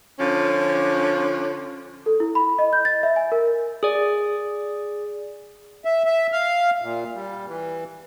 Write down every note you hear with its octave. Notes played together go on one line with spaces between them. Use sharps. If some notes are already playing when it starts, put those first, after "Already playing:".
D3 F3 C#4
A4
E4
B5
D#5
G6
A6
E5
G#5
A#4
G#4 D5
E5
E5
F5
A#2
G3
E3